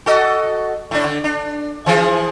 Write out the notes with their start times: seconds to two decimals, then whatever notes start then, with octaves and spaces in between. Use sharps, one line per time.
0.06 F#4 A4 D#5
0.91 A2 D4
1.04 D3
1.24 D4
1.86 E3 F3 G#4